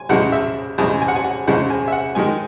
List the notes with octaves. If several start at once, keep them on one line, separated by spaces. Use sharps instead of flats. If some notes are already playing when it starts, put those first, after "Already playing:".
Already playing: G#5
E2 C#3 G#3 F#5
E5
E2 C#3 G#3 G#5
G#5
F#5
G#5
F#5
E2 C#3 G#3 F#5
G#5
E5
F#5
G#2 D#3 G#3 G#5